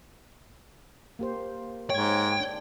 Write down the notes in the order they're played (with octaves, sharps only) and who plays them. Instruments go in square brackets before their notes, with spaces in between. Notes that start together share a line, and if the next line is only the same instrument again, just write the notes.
[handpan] A#3 G4 C5
[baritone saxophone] G#2 [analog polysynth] C#5 G#6 [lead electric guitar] G5
[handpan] D4